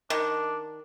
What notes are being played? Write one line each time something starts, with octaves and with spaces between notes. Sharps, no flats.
D#3 D4